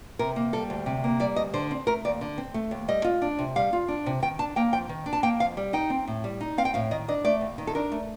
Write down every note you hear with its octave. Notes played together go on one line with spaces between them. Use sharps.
C3 A#4
A#3
G3 A4
D2
C3
A#3
G3 D5
D2 D#5
D3 C5
C4
A3 A#4
D#2 D5
D3
C4
A3
D#2
G3 D#5
F4
D4
C3
G3 F5
F4
D4
C3
D#3 G5
D4 A5
A#3 G5
F2 G5
D#3
D4
A5
A#3 G5
F2 F5
G3
D#4 G5
C4
A2
G3
D#4
C4 F5
G5
A2 F5
D#3 D#5
D4 D#5
A3 D5
D#2
D#3
A4
D4 A#4
A3